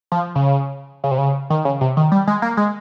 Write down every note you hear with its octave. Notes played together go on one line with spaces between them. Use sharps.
F3
C#3
C#3
C3
C#3
D#3
C#3
C3
D#3
G3
G#3
A#3
G#3